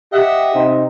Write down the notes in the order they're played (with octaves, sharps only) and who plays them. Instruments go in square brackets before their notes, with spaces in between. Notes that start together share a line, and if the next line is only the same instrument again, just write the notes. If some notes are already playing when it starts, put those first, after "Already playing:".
[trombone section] G4 [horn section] D#5 E5 F#5
[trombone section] C3 C4 D#4